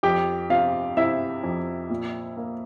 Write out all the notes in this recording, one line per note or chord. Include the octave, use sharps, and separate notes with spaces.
F2 G4 G5
C3 F4 F5
C3 E4 E5
F2
A#2
A#3